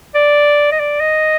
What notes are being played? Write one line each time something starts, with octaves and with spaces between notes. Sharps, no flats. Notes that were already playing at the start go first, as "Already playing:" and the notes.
D5
D#5
D5
D#5